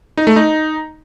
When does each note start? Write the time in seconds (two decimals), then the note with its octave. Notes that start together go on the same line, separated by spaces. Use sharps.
0.17 D#4
0.27 A3
0.36 D#4